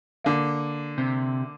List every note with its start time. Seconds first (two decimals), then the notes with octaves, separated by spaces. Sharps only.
0.24 D3 A#3
0.98 C3